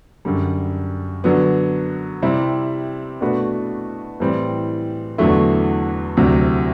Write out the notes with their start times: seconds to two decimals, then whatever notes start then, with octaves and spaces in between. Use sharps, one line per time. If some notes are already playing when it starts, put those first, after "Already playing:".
0.25 F#2 D3 G3
1.24 D3 F#3 B3
2.22 C3 G3 C4 E4
3.21 B2 A3 D4 F#4 B4
4.20 A2 E3 G3 C4
5.18 E2 D3 F#3 A3 E4
6.17 D2 C3 F#3